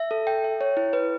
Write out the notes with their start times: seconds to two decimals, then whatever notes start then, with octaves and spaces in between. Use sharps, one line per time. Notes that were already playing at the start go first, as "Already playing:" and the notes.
Already playing: E5
0.11 A4
0.27 G5
0.44 E5
0.61 C#5
0.77 E4
0.93 B4